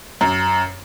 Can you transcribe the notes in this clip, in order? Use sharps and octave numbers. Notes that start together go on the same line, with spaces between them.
F#2